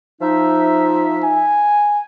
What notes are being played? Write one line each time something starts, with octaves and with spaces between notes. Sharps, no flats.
F3 D#4 E5
G#5